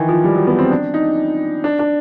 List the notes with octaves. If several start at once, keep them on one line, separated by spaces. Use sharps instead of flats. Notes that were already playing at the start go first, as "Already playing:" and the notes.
Already playing: D#3 E3
F3
G3
F#3
B3
C4
D4
D#4
D4
D4